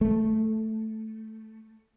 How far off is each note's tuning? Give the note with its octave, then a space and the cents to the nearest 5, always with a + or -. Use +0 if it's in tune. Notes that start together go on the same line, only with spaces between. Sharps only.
A3 +0